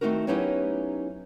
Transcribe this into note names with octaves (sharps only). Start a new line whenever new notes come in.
D#3 A3 C4 D#4 F#4 A#4
F#3 B3 C#4 D#4 E4 G4